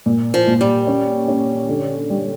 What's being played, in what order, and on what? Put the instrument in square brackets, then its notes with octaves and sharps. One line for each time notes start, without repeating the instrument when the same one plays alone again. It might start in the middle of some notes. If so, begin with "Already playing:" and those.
[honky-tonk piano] A#2
[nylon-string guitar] F3
[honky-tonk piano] A#2
[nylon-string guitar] G3
[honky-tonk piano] C#4
C#4
D3
G3